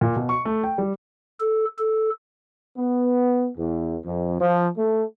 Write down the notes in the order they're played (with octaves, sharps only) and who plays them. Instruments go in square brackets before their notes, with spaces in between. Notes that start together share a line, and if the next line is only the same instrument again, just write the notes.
[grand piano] A#2
B2
C#6
A3
G5
G3
[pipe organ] A4
A4
[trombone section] B3
E2
F2
F3
A3